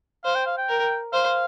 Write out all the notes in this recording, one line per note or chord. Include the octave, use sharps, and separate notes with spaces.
C5 F5
G5
F5
G5
A#4
C5 F5